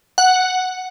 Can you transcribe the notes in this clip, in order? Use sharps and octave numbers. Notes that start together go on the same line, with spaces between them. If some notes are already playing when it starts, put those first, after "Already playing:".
F#5